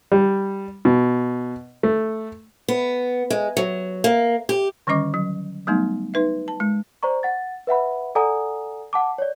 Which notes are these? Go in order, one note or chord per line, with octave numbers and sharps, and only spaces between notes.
G3
B2
A3
B3
G#3
F#3
A#3
G4
D3 D#3 G3 C#4 D#5 D6
F#3
F#3 G3 A3 B3 D#4
D#4 B4 E5
A5
G#3
C5 D5 A#5 C#6
F#5 A6
B4 E5 F#5 B5
A4 D5 F#5 G#5 A#5 D#6
F#5 A5 D6
C#5 D5